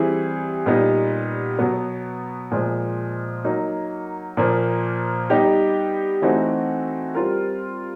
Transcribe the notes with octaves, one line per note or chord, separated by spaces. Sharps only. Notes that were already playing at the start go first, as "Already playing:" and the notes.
Already playing: E3 G3 C4 E4 G#4
A#2 G3 B3 D#4
B2 F#3 B3
A#2 F3 G#3
F#3 A#3 D#4
A#2 F3 A#3
G3 B3 D#4 G4
E3 A3 C4 D#4 F#4
G3 C4 F4 A#4